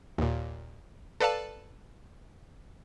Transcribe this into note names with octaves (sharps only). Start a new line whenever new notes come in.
D#2 A#2
A4 B4 D5 F5 A5